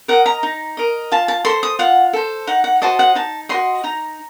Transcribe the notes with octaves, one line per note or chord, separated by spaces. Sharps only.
A#4 D#5 F#5
A#5
D#4
A#4 D#5
F4 A5
A5
A4 C5 C6
D#6
F4 F#5
A4 C5
D#4 F#5
F#5
F#4 C5 D#5 A5
F#5
D#4 A5
F#4 C5 D#5 C6
D#4 A#5